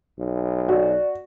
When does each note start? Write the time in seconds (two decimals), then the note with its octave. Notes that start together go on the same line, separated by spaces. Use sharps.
0.19 B1
0.69 F#4 D5